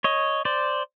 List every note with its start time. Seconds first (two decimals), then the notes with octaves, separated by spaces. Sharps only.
0.04 C#5 D#5
0.45 C5 D5